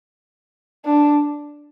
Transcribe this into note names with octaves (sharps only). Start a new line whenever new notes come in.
D4